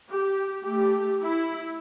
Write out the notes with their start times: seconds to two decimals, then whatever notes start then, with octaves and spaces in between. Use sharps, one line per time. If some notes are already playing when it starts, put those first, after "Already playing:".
0.10 G4
0.64 A3 G4
1.23 E4